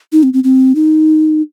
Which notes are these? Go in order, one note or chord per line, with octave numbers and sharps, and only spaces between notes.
D#4
C4
C4
C4
D#4